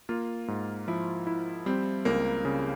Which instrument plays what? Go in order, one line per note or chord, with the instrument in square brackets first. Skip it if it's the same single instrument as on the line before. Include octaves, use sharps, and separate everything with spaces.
[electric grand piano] A#3 [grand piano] F4
[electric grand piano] G#2
[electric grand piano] F3 [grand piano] E4
[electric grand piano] E4
[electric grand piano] G3 [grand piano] C4
[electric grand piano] C#2 [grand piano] A#3
[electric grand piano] C#3